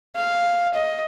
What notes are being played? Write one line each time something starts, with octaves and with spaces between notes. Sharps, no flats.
F5
D#5